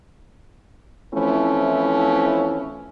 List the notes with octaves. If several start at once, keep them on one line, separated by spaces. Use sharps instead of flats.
E3 F3 A3 C4 C#4 E4